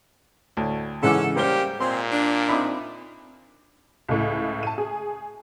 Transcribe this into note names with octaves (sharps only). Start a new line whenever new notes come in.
D2 A2
G#2 C#3 E3 C#4 A4 E5 F#5 D6
G#2 G3 A#3 C#4 G4 C5 G7
A#2 G#3 C4 C6
D4
C4 D#4 E5 B5 D6
C#2 A2
A5 D#7
G#4